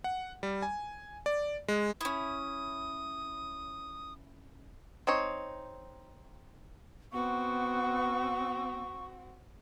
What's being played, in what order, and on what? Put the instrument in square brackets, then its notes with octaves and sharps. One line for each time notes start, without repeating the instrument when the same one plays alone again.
[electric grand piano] F#5
G3
G#5
D5
G#3
[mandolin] C#4 E4 [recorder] D#6
[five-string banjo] C4 D#4 C#5
[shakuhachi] B3 [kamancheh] C4 F#4 [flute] C#6